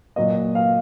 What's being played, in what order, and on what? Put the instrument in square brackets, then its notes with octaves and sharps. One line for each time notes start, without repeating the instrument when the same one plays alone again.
[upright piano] A#2 F#3 A#3 D#5
F5